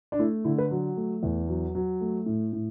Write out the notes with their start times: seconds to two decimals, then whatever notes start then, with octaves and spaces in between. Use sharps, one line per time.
0.12 D4
0.19 A3 E4
0.44 D3 E4
0.58 B4
0.71 F#3
0.97 A3
1.23 E2
1.48 F#3
1.75 F#3
2.01 A3
2.26 A2
2.53 A2